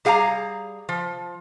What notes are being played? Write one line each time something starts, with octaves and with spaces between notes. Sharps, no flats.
G3 G#4 F5 G5 A#5
F3